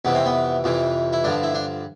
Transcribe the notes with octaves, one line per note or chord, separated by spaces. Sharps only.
F2 C3 E3 B3
C4
B3
F2 C3 E3
E4
G2 D3 F3 D4
E4
D4